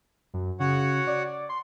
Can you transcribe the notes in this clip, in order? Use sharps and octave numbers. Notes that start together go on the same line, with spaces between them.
F#2
C#3 F#4 C#5 F#5
D5
C6